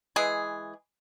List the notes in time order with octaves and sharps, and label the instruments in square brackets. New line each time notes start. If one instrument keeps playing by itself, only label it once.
[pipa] E3 G#3 G#4